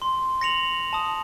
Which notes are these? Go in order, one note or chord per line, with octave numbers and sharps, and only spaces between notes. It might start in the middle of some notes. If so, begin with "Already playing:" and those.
C6
A#6 C#7 F7 F#7
A5 D#6